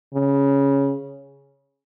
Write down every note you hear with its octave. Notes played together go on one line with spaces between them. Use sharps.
C#3